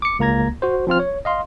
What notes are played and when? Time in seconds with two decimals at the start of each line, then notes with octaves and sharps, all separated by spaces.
0.02 D6 C#7
0.19 C#2 A#3 A#5 G#6 A#6
0.62 F#4 C5
0.87 F3 C4 F4 F6
0.99 C#5
1.25 D#5 F5 C6